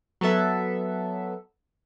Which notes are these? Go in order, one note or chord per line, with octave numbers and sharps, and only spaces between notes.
F#3 B3 A4 E5